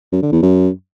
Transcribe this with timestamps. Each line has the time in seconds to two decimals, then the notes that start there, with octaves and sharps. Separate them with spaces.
0.12 F#2
0.22 D3
0.32 E2
0.42 F#2